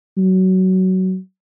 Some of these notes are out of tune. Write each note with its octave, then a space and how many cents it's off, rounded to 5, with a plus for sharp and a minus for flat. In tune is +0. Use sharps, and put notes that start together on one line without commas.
F#3 +15